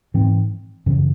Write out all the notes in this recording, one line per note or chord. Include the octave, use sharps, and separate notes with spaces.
G#2 E3 C4
F#2 C#3 E3